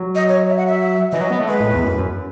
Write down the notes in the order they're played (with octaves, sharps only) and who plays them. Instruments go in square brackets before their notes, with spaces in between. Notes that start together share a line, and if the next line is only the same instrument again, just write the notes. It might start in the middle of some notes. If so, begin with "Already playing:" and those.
Already playing: [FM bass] F#3
[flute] D#5
C#5
E5
F#5
E5
[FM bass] E3 [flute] D#5
[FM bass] F#3
B3
A3
[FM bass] G#3 [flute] B4
[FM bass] A2
E2
F#2
F#2